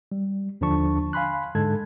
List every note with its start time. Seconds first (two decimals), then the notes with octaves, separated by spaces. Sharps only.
0.12 G3
0.61 D#2 D3 F3 D4 A5 C#6
1.13 F5 G#5 B5 C6 F#6
1.55 G#2 D3 G#3 A4 A5 G#6